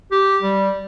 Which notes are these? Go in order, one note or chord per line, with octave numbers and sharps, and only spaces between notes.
G4
G3